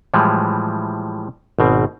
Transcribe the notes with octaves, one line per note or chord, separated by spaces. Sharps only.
A2 E3 F3 G3 G#3
G#1 B2 C4